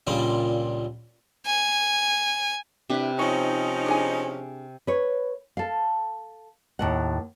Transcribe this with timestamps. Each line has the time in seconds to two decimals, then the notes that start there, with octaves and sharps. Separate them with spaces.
0.07 C#2 A#2 G3 D4
1.46 G#5
2.90 C3 D4 E4 B4
3.19 F3 C#4 D#4 C#5
3.86 D4 G#4 G#5
4.87 B4 C#5
5.57 A4 F5
6.79 D#2 A2 F#5